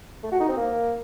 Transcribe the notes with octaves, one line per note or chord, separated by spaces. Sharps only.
A3
F#4
D#4
C4
A#3